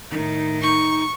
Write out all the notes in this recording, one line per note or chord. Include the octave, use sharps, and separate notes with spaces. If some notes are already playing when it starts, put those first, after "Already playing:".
A2 D#3 D#4
D#4 C#6